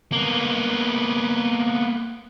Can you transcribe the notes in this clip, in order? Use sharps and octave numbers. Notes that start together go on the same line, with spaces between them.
A#3 B3